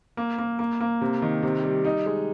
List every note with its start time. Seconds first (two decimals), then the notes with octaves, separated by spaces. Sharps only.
0.17 A#3
0.38 A#3
0.59 A#3
0.80 A#3
1.01 C3
1.22 D#3
1.43 C3
1.64 G3
1.85 D#4
2.06 G#3